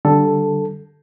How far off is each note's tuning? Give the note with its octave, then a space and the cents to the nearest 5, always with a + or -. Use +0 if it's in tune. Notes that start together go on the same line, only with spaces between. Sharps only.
D3 +0 G3 -15 A4 +0